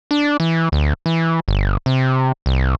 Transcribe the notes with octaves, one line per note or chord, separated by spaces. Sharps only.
D4
E3
D2
E3
G1
C3
C2